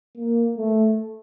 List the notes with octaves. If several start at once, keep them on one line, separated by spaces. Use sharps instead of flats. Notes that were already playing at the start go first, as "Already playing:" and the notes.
A#3
A3